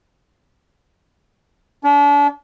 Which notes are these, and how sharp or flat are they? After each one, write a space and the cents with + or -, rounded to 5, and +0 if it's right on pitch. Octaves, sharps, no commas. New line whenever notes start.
D4 -40